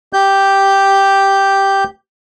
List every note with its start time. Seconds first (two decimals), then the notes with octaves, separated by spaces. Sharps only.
0.13 G4 G6